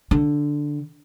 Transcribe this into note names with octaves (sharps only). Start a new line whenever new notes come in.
D3